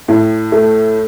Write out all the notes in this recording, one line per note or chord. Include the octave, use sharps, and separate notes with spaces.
A2
A3